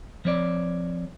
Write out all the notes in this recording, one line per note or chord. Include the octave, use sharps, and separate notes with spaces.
F3 C4 C#5 D5